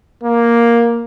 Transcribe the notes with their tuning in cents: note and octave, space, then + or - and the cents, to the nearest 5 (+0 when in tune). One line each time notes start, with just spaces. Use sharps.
A#3 +5